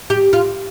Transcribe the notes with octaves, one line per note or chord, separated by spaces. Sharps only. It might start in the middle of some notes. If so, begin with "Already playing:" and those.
G4
F4